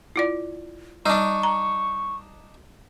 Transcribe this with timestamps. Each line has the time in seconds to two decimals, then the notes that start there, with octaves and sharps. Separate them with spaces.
0.16 E4 F4 D5
1.06 G3 D4 D#4 C#6
1.43 A#5